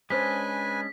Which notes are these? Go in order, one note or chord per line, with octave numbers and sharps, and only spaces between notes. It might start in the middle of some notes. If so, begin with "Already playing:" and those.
G#3 C#4 D4 B4 C5 G#5 B6